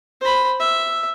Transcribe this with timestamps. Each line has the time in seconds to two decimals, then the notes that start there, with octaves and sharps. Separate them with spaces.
0.21 C5 B5
0.60 E5